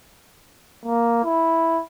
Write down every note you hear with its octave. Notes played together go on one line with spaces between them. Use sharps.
A#3
E4